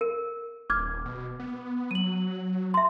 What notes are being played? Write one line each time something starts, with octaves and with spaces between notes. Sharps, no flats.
A#4
D#1 D6 F6 G#6
B2
B3
F#3 D#7 F#7
E5 C6